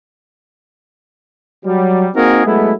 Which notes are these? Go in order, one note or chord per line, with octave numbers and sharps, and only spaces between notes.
F#3 G3
A#3 C4 D#4 F#4 G#4 A#4
F#3 G#3 A3 B3 E4